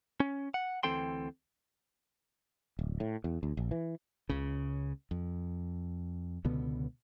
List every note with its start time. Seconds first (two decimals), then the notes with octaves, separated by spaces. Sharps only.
0.20 C#4
0.54 F#5
0.83 D2 E3 C4 A4 G5 C6
2.79 D1
3.00 A2
3.24 E2
3.43 D2
3.57 A#1
3.71 E3
4.29 C#2 C#3
5.11 F2
6.45 C#2 B2 D3 B3